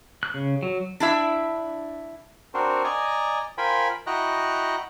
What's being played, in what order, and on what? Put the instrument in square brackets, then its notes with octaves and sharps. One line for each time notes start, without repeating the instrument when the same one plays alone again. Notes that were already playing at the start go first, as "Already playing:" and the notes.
[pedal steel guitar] F#6
C#3
F#3
[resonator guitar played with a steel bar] D4 E4 E5
[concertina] C4 D4 F#4 A#4 C5
D5 D#5 G#5 A#5
F4 A#4 C5 G5 G#5 B5
E4 F#4 D#5 G5 A#5 F#6